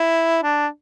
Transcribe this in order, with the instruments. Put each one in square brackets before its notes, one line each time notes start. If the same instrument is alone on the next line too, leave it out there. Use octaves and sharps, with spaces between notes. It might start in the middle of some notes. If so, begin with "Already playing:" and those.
Already playing: [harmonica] E4
D4